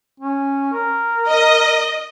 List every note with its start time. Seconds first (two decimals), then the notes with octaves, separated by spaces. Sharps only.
0.20 C#4
0.73 A#4
1.27 D#5